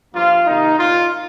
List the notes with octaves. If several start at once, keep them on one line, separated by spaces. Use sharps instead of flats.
G2 F3 A#3 F4
C3 D#3 A#3 D#4
A#2 A#3 F4